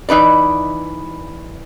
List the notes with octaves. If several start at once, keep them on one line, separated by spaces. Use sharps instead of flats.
E3 D#4 B4 D5